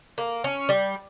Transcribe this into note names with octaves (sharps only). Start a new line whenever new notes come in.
A#3
C#4
G3